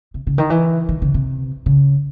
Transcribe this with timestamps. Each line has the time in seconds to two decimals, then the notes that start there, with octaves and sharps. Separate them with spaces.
0.14 C3
0.27 C#3
0.38 D#3
0.50 E3
0.89 D#3
1.02 C#3
1.14 C3
1.66 C#3